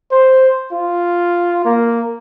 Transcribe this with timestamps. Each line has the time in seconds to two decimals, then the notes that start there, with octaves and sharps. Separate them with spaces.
0.11 C5
0.72 F4
1.65 A#3